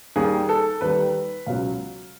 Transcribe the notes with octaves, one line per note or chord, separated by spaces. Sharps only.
D#2 D#3 G3 G#4
A4
D#2 D#3 G3 B4
C#2 B2 F#3 F5